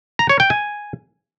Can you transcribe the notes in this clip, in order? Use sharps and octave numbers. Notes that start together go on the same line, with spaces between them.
A#5
C#5
G5
G#5